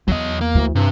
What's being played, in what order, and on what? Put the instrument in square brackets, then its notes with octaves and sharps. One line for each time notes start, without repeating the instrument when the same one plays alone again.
[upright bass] E2 [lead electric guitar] F#3 D#5
[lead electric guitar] A#3
[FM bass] D2 [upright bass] E3
[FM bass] G2 [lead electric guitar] C3